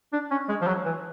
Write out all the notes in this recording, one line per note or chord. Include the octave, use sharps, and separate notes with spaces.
D4
C#4
G#3
F3
F#3
E3